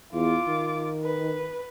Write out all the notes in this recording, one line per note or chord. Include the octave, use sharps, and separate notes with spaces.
E2 F4 D6
D#3
B4